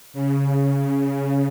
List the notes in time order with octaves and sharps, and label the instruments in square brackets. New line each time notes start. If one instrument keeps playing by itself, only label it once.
[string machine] C#3